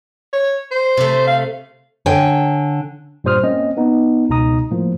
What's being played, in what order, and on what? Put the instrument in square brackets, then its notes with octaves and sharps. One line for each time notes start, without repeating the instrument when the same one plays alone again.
[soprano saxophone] C#5
C5
[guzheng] C3 A3
[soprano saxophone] F5
[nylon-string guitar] D3 C#5 G5 G#5
[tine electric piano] G2 A#2 G3 C5 D#6 F6
A#3 C4 C#4 D#5
B3 D#4
C#2 B2 D#4 A#5 D#6
A2 F3 A#3